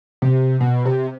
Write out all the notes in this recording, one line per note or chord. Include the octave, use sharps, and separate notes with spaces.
C3
B2
C3